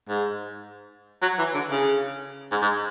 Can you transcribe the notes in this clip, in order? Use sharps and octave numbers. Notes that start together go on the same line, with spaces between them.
G#2
F#3
E3
D3
C#3
G#2
G#2